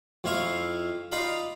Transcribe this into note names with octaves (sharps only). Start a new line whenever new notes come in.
F2 E4 F4 F5 C#6
D#4 F4 D5 F5 A#5 B5